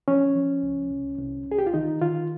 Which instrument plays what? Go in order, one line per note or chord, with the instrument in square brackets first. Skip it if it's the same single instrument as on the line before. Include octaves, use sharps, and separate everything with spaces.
[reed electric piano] F3 C#4
F3
C#2
C2
C2
C2
G#4
G4
F4
D#3 D#4
D#3 F4